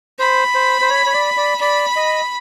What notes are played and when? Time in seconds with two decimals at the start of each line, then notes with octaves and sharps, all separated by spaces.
0.19 C5 B5
0.55 C5
0.81 C5
0.90 C#5
1.06 C#5
1.14 D5
1.37 D5
1.61 D5 B5
1.96 D#5